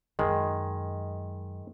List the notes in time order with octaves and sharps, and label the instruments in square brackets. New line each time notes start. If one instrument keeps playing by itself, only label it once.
[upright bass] F#2 [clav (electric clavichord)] D#3 G#3